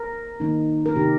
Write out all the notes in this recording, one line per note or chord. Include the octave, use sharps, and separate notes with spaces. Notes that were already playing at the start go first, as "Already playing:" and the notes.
Already playing: A#4
D#3 A#3 D#4
A#4
C3 D#3 C4 D#4 G4